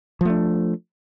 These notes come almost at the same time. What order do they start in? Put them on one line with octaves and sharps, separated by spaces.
F3 A3 D4